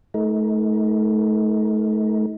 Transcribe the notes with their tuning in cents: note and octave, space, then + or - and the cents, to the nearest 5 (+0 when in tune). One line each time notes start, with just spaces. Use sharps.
A3 -30 D#4 +35 A#4 +10